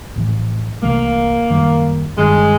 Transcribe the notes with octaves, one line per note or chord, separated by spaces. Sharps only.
A#1 A2 E3
C2 C3 E3 A3 A#3
F#2 D#3 G3
G1 G2 D#3 G#3